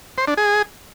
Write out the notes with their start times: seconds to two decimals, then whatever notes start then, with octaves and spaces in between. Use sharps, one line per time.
0.18 C5
0.28 D4
0.37 G#4